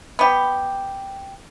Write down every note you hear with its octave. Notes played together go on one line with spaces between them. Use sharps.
B3 G4